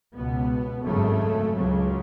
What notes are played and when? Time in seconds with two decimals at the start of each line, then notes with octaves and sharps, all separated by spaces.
0.15 C#2 B2 B3
0.84 G#1 F#2 C#3 A3
1.55 C#2 C#3 F#3